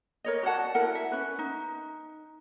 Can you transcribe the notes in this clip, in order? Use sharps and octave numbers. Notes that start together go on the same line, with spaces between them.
A#4 C#5 D#5
F#4 D5 F#5 A5
E4 A#4 F#5
E5
C#4 B4
D#4